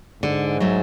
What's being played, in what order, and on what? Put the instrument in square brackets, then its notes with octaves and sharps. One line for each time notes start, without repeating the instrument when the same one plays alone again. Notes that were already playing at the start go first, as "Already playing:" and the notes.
[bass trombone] G#2 [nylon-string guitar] D3
[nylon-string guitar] F#3 A3